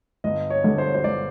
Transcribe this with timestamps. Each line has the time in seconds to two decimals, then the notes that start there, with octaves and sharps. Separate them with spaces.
0.24 G1 D#5
0.50 C#5
0.64 G2 D3
0.78 C5
0.85 C#5
0.95 C5
1.04 G1 D5